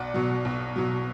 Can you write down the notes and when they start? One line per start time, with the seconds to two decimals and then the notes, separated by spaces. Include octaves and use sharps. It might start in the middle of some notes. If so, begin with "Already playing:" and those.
Already playing: B1 D5 F#5
0.14 B2 F#3
0.45 B1
0.76 B2 F#3